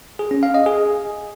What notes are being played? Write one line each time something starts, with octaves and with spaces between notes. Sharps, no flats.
G#4
C#4
F5
D#5
G#4